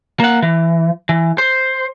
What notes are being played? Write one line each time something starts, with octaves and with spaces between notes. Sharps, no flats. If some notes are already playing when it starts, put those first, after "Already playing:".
A#3 F#5
E3
E3
C5